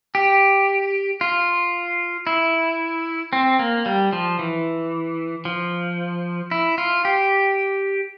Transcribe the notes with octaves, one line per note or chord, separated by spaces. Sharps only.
G4
F4
E4
C4
A#3
G3
F3
E3
F3
E4
F4
G4